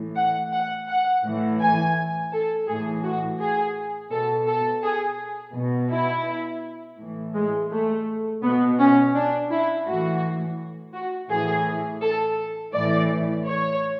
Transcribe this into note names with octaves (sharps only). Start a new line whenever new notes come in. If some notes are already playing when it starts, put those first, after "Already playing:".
Already playing: A2 E3
F#5
F#5
F#5
A2 E3
G#5
A4
A2 E3 G#4
F#4
G#4
B2 A4
A4
G#4
B2
E4
A2 E3
G#3
A3
B2 B3
C#4
D4
E4
A2 E3 F#4
F#4
A2 E3 G#4
A4
A2 E3 D5
C#5